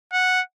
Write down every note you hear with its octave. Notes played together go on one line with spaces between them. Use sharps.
F#5